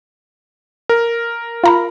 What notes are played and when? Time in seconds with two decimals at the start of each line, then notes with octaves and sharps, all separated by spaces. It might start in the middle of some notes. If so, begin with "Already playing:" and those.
0.89 A#4
1.64 F4 A#5 B5